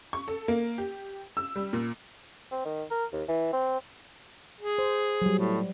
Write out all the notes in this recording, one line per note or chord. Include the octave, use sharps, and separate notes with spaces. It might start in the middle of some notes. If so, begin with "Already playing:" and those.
C#6
A4
A#3
G4
E6
G3
A#2
C4
D#3
A#4
D#2
E3
C4
G#4
C5
F#3 G3
A2